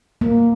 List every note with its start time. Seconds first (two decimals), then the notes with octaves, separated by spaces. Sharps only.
0.21 A#3